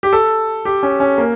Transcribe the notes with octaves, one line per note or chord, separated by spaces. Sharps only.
G4
A4
G4
C#4
C#4
A#3